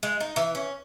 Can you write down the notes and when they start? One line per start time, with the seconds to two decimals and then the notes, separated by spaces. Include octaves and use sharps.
0.03 G#3
0.20 D#4
0.36 E3
0.55 C#4